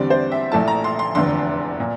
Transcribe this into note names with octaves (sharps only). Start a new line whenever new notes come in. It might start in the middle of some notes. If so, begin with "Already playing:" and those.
Already playing: E2 D3 G3 C4 D5
C5
E5
A#1 A#2 A3 E4 A5
A#5
C6
C6
F1 E2 D3 C6
A#2